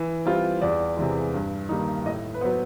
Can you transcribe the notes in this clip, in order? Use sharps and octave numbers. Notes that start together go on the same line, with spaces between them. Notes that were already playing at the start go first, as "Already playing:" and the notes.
Already playing: E3
G3 C4 F4
E2 D5
C3 E3 G#3
G2
D#3 G3 A#3 D#4
A2 D#5
B4
F#3 B3 C5